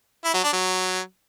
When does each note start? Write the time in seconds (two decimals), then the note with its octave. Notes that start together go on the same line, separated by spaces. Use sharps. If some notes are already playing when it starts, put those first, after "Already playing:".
0.25 E4
0.34 F#3
0.44 D4
0.53 F#3